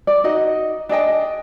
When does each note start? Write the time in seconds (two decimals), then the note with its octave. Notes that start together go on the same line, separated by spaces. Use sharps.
0.07 D5
0.24 D#4 F#4 D#5
0.89 D4 G#4 D#5 G5